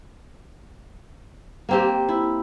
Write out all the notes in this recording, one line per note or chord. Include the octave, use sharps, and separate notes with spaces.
A#3 C4 G4
E4